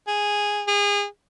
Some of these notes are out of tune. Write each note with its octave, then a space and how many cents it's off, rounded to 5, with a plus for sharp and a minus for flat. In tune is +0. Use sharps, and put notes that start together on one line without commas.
G#4 -5
G#4 -30